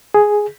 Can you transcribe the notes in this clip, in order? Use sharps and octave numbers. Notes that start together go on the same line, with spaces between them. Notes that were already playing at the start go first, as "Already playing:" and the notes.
G#4